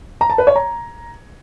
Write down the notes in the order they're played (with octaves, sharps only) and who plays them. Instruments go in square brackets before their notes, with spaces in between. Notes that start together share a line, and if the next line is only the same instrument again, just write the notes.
[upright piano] A#5
A5
B4
C#5
A#5